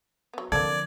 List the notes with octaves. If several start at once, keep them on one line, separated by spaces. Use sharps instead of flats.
F#3 B3
D3 F3 A#3 C4 A4 D5 G#6